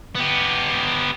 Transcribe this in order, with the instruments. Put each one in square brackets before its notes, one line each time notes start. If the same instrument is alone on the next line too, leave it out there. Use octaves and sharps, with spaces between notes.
[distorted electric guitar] B3 G4